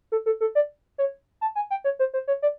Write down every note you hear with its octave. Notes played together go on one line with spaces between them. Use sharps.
A4
A4
A4
D5
C#5
A5
G#5
G5
C#5
C5
C5
C#5
D5